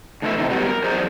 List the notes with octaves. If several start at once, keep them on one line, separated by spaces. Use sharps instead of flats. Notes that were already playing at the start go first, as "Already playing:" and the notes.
A2 D#3 A3 D#4 B4 E5
A2 C3 G3 C4 D#4
F#3 G3 B3
A#4
E2 F#3 C4 G#4 C5 D5